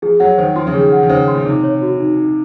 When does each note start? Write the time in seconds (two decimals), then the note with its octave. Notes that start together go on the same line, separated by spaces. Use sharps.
0.02 F3 G#4
0.20 F#3 F#5
0.38 D#3 C5
0.56 F3 C6
0.67 C#3
0.74 D#3 G#4
0.92 F#5
1.03 D#3
1.10 C#3 C5
1.28 C6
1.35 A#2
1.45 C3 D#4
1.64 C#5
1.82 F#4
2.00 D#4
2.16 D#4